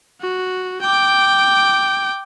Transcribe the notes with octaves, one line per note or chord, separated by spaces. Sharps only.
F#4
G5 D6